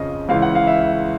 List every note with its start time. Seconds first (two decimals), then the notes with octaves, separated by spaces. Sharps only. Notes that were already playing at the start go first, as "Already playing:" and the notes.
Already playing: F2 C#3 F3 D#5
0.29 C#2 C#3 E3 F5
0.42 F#5
0.55 F5
0.67 E5